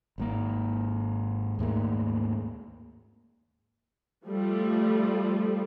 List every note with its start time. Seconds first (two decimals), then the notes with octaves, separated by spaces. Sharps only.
0.18 G#1 G#2 A#3
1.59 D#2 G#2 A3 A#3
4.25 F3 G3 A3